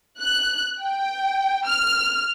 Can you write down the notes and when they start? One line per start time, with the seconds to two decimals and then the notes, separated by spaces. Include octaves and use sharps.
0.20 F#6
0.82 G5
1.66 F6